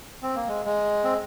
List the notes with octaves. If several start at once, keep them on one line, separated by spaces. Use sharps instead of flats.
C4
A#3
G#3
G#3
C4